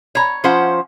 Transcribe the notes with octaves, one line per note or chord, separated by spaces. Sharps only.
C#5 A#5
F3 C#4 F4 C5 F#5